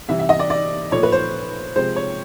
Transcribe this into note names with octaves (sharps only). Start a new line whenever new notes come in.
C3 E3 G3 E5
E5
D#5
D5
D5
A#2 F3 A3 C#5
B4
C5
C3 F3 G#3 C5
C#5